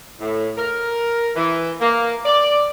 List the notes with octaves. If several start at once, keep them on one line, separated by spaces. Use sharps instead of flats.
A2
A#4
E3
A#3
D5